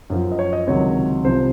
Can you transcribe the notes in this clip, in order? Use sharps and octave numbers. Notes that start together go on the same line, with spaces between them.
F#2 F3
D#5
C#5
D#5
C#2 C3 D#3 F#3 C#5
C2 C3 F3 C5